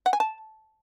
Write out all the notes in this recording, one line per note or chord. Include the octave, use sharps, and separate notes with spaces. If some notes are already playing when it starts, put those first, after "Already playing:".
F#5
G#5
A5